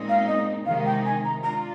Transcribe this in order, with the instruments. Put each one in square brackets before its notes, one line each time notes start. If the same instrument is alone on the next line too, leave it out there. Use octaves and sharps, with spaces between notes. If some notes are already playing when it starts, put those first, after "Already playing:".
Already playing: [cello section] A#2 G#3 C4 D#4
[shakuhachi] F5
D#5
[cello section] C3 D#3 G#3 D#4 [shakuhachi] F5
[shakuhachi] G5
G#5
A#5
[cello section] D4 F4 [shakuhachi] A#5